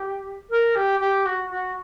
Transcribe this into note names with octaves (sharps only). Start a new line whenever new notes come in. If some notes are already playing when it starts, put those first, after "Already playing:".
Already playing: G4
A#4
G4
G4
F#4
F#4